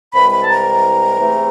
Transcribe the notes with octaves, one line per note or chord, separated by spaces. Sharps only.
C2 C3 E3 G#3 B5
B5
A5
A#5
E2 C3 E3 A3